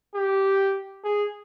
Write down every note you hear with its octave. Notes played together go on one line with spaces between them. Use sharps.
G4
G#4